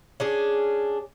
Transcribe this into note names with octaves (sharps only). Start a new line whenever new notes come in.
C#4 D4 G#4